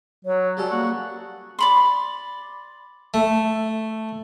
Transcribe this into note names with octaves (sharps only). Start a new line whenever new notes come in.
F#3 C#5
C#3 G3 F#4 A4
A#3 F#4
D5 B5 C6
A3